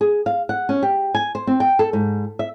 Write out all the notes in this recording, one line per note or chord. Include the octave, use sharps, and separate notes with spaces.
G#4
F5
F#5
C#4
G4
G#5
C5
C4
G5
A4
G#2
E5